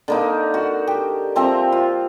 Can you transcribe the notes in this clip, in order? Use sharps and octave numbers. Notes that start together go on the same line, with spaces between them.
D3 A#3 D#4
F#4
G4
F3 C4 E5 A#5
F4